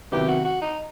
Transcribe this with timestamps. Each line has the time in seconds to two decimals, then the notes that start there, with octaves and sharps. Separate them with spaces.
0.12 C3 D#3 F#3 B3 E4 G4
0.28 F#4
0.45 F#4
0.61 D#4